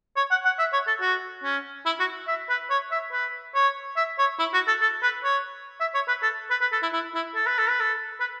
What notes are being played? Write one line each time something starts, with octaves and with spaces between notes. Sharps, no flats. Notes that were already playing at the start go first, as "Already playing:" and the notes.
C#5
F#5
F#5
E5
C#5
A4
F#4
C#4
E4
F#4
E5
B4
C#5
E5
B4
C#5
E5
C#5
E4
F#4
A4
A4
B4
C#5
E5
C#5
B4
A4
B4
B4
A4
E4
E4
E4
A4
B4
A4
B4
A4
B4